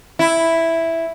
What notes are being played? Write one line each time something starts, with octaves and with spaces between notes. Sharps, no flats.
E4